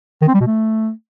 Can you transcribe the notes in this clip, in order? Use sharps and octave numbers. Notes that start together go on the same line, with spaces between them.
D#3
C4
G3
B2
A3